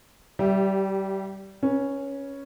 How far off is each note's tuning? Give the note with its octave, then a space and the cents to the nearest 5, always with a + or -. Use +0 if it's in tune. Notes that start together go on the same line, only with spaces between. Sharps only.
G3 -25 G4 +0 E5 +0
C#4 +0 B4 -30